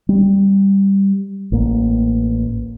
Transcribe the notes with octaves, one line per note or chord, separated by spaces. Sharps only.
G3
A1 A#3